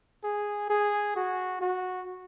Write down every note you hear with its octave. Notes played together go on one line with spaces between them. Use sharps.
G#4
G#4
F#4
F#4